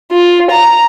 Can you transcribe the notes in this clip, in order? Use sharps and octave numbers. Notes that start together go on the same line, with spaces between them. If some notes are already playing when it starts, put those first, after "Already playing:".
F4
A#5